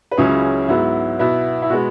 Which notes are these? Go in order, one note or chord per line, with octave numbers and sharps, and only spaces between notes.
B4
C#2 C#3 F#3 C#4 E4 G#4
G#2 F#3 B3 E4
B2 B3 E4
E4
B2 G#3 B3 F#4